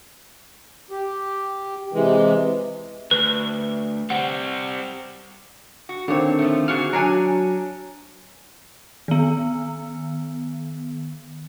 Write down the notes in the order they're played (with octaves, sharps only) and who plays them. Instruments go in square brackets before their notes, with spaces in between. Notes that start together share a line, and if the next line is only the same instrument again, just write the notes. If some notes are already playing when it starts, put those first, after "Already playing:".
[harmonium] G4
C3 E3 G#3
[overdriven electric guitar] D2 [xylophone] B4
[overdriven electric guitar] G3 C4 [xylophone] F#5
[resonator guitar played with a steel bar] F#4
[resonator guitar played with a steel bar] A#2 C#5 [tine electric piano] D3 D#3 C4
[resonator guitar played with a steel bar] F3 A3
[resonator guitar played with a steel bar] A#2 F#4 G#4 [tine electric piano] F6
[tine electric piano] F#3 A#5 [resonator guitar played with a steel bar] D4 C#5 G#5
[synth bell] D#3 B3